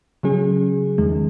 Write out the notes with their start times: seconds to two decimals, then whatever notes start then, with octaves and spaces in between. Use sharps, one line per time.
0.23 C#3 F#3 C#4 G#4
0.98 E2 D#3 G#3